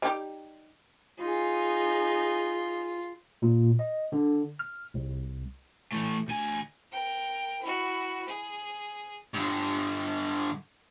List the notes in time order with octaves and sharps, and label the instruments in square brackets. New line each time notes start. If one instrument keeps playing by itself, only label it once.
[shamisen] G3 D#4 G4
[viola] D#4 G#4 [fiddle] F4
[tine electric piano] A#2
D#5
D3
F6
C2
[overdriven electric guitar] E3 A3
D2 G#5
[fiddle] A#4 G5
E4 F#4
G#4
[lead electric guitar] G2 D3